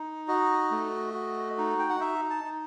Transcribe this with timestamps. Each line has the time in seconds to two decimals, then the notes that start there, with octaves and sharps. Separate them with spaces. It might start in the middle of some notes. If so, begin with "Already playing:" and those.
Already playing: D#4
0.28 F#4 D#5
0.71 A3
1.14 F#4
1.58 D#4
1.79 G5
1.89 F#5
2.00 D#4 E5
2.30 A5
2.44 D#4